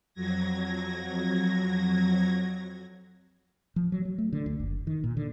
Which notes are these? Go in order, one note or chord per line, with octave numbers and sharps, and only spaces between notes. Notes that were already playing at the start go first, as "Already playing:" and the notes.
F2 F#3 G#6 A#6
F3
F#3
F#3
A3
D3
D2
F#1
D#3
A#2
D3